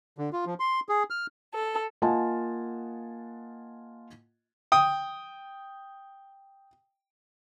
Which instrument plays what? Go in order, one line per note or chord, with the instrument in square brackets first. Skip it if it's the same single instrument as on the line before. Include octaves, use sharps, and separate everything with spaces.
[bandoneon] D3
F4
F3
C6
G#4
F6
[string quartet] A4
[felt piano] A#3 F4 D#5 F#5 G#5 A5
[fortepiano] G5 D#6